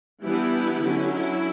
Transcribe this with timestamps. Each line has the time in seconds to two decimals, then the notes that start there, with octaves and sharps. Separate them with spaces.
0.23 E3 G3 B3 D4 E4 G4
0.83 D3 F#3 C#4
1.12 E4